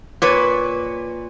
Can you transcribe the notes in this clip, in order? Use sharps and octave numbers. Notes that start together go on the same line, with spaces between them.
A#2 B4 C#5